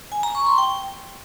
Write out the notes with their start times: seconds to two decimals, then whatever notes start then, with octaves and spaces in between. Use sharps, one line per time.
0.12 G#5
0.23 A#5
0.35 C#6
0.46 C6
0.58 G5